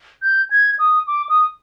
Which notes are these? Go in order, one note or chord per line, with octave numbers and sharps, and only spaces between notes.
G6
G#6
D#6
D6
D#6